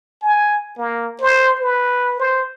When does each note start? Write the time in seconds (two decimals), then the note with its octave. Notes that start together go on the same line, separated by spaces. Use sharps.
0.22 G#5
0.78 A#3
1.21 C5
1.61 B4
2.19 C5